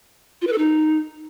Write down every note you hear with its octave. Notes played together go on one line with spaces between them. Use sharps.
F4
B4
A4
D#4